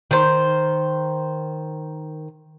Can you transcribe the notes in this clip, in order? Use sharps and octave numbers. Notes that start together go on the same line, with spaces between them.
D#3 C5